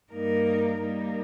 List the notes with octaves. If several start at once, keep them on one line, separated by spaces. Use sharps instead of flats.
G2 G3 A#3 D#4 A#4
G3 A#3 D#4